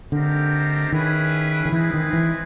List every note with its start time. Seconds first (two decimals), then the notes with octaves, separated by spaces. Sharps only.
0.12 D3 A3 C4 D#4 G4 A#4
0.92 D#3 C#4 E4 G#4 B4
1.66 D#3
1.72 E3 G#3 C4 E4 G#4 B4
1.94 D#3
2.13 E3